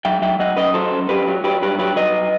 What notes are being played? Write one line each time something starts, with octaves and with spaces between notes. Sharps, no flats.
F#3 E5 G5
F#3 E5 G5
F#3 D#5 F#5
F#2 B4 D#5
F#3 A4 C5
F#2
F#2 G4 B4
F#3
F#3 G4 B4
G2 G4 B4
F#3 G4 B4
F#3 B4 D#5